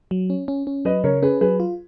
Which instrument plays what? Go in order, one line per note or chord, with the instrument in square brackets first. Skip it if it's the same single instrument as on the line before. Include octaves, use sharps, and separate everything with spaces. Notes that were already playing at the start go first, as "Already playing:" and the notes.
[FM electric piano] F#3
C#4
C#4
C#4
[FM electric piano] F#3 [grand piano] B4 D#5
[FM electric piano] C#3 [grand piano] A#4 C#5
[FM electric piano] C#4 [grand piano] G#4 B4
[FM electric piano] F#3 [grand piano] G#4 B4
[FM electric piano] F4